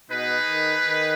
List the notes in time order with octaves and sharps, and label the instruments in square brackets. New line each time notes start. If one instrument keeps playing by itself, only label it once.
[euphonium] B2 [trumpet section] D#4 G#4 B4
[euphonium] D#3
D#3